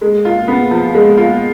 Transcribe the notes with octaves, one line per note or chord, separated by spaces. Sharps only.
G#3
F4
B3
F3
G#3
F4